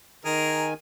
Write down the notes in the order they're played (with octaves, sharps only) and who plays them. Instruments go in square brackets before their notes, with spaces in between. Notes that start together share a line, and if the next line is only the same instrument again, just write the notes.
[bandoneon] D#3 G#5 [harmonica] G#4 A#4